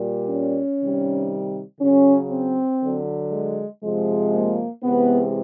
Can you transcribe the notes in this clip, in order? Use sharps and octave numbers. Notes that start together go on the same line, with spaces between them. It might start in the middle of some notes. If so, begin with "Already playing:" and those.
Already playing: A#2 G3
C#4
C3 D#3 G3
C#3 F#3 C#4
C4
D3 F#3
G#3
C3 F3 G#3
A#3
C3 E3 G#3 B3